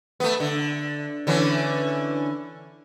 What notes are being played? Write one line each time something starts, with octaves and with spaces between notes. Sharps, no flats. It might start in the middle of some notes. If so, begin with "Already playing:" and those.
A3 B3
D3
D3 E3 C#4